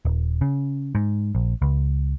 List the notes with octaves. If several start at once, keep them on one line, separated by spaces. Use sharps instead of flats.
D#1
C#3
G#2
A#1
C#2